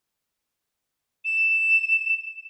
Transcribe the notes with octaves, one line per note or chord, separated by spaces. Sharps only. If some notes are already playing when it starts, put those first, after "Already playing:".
E7